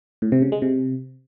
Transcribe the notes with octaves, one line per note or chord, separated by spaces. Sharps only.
A2
C3
C#3
G#3
C3